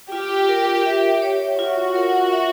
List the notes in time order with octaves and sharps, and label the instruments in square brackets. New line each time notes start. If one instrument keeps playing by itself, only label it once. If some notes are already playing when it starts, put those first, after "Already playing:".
[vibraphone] F4 [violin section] G4
[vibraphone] A#4
E5
C#5
[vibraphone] F4 [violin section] F#4
[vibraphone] A#4
E5